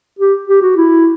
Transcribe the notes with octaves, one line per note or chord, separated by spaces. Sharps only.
G4
G4
F#4
E4